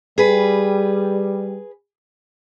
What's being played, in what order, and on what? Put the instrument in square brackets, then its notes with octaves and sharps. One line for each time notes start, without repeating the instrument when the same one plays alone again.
[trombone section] G3 [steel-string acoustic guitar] G#4 B4